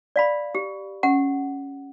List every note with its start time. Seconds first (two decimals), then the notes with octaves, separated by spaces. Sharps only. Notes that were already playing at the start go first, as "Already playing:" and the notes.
0.16 D5 F5 B5
0.55 G4
1.03 C#4 F#5